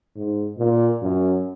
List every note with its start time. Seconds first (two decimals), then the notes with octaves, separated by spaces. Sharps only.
0.16 G#2
0.58 A#2
1.02 F#2